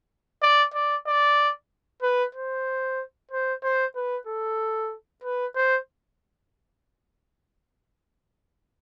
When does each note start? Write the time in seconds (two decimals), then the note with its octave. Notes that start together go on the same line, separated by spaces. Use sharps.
0.43 D5
0.74 D5
1.07 D5
2.02 B4
2.35 C5
3.31 C5
3.63 C5
3.95 B4
4.27 A4
5.24 B4
5.55 C5